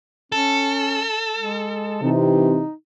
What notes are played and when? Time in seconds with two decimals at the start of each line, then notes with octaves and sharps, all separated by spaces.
0.32 C#4 A4
1.37 G#3
2.02 C3 E3 D#4